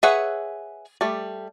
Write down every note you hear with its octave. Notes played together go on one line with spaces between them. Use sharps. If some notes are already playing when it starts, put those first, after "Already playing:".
G#4 B4 C#5 E5 F#5
G3 A3